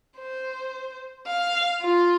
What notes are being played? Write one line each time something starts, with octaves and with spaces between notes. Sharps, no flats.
C5
F5
F4